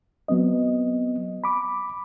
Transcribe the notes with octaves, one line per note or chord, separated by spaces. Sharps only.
F#3 B3 C4 D#5
B5 D6